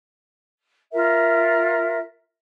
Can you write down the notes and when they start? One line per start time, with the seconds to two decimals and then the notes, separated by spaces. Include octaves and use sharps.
0.93 F4 A#4 E5